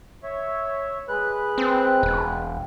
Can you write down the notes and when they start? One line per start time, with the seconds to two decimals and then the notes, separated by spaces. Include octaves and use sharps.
0.23 C#5 E5
1.09 G#3 B4 F#6
1.58 C4
2.03 E1